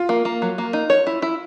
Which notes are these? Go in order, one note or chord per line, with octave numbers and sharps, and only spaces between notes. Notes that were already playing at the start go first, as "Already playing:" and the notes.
Already playing: F4
A#3
A#3
F#3
A#3
D#4
C#5
E4
E4